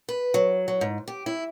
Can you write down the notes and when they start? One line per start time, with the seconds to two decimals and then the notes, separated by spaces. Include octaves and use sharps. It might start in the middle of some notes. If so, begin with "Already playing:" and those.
0.09 B4
0.34 F#3
0.68 F#3
0.81 G#2
1.08 G4
1.26 E4